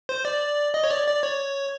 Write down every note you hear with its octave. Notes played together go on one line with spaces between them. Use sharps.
C5
D5
D#5
C#5
D5
D5
C#5